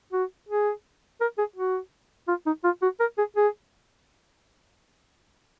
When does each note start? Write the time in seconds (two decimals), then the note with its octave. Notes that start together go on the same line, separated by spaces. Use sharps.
0.12 F#4
0.48 G#4
1.21 A#4
1.38 G#4
1.56 F#4
2.28 F4
2.46 D#4
2.64 F4
2.82 F#4
3.00 A#4
3.18 G#4
3.36 G#4